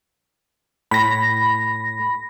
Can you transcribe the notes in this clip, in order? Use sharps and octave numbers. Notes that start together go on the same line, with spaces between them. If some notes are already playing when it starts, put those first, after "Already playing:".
A2 B5 A#6